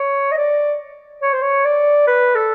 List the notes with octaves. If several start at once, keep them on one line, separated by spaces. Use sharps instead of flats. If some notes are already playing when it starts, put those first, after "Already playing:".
Already playing: C#5
D#5
D5
C#5
C5
C#5
D5
B4
A4